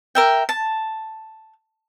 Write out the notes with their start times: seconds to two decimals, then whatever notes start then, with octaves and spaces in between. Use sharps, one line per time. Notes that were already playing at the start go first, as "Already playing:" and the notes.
0.15 A#4 E5 G5
0.49 A5